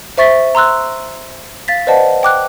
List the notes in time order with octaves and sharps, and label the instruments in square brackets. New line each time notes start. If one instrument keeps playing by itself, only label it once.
[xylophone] C5 E5 C#6 A6 B6
A#5 C6 E6 F#6
F5 A6 B6
B4 C5 D5 D#5 F#5 A5
G5 D6 F#6